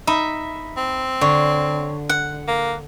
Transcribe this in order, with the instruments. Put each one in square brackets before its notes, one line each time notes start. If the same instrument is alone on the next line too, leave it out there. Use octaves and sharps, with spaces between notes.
[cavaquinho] D#4 B5 [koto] E5
[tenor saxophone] C4
[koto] D3 [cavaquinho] C#5
[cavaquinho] F#5
[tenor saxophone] A#3